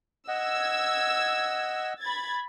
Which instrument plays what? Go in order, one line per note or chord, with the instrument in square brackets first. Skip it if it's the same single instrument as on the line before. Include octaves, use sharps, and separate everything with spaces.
[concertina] D#5 F#5 [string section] E6 G#6
[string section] B5 G#6 A6